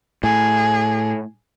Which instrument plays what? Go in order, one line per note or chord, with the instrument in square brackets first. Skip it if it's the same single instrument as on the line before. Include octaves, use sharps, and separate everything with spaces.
[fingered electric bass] A2 [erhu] G#4